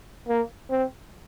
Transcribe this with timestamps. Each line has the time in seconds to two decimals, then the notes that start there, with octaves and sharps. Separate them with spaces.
0.28 A#3
0.70 C4